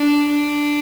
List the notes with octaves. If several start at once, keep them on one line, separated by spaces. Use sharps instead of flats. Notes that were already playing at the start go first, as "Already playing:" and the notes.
Already playing: D4
D4